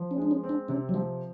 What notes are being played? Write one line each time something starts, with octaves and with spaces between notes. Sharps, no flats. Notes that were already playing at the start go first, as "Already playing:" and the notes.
Already playing: F3
C#4
G#3 D4
C#4
C4
D4
C3 C#4
F#3
F3 G3